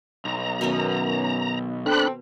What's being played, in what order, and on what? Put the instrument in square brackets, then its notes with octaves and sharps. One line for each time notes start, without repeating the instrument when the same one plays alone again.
[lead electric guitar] B1 [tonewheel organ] A#5
[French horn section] F#2 [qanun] B2 D#3 B3
[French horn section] C4 A4 [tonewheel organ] D4 B5 F#6